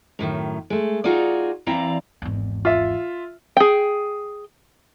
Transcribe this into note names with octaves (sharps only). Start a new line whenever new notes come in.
F#2 A2 D#3
G#3 A3
D#4 F4 F#4 G#4 D5
E3 C4 E4 D5 F5 A#5
G#1 E2
F4 E5
G#4 G5